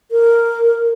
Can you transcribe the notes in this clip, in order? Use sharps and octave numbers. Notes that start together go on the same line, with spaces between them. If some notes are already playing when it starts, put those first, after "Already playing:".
A#4